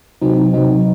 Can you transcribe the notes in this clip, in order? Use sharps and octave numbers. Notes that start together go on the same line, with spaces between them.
C3 F#3 C4 D#4
C3 F#3 C4 D#4